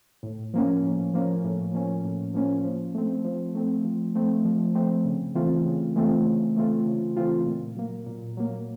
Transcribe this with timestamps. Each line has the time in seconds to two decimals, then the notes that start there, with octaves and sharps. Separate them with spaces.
0.23 A2
0.54 F3 A#3 C#4
0.83 A2
1.14 F3 A#3 C#4
1.44 A2
1.74 F3 A#3 C#4
2.04 A2
2.34 F3 A#3 C#4
2.64 F3
2.94 A3 C4
3.24 F3
3.55 A3 C4
3.85 F3
4.15 A3 C4
4.45 F3
4.75 A3 C4
5.05 C#3
5.35 E3 A3 C4 F4
5.65 C#3
5.96 E3 A3 C4 F4
6.26 C#3
6.56 E3 A3 C4 F4
6.86 C#3
7.16 E3 A3 C4 F4
7.46 A#2
7.76 F#3 A#3
8.06 A#2
8.37 F#3 A#3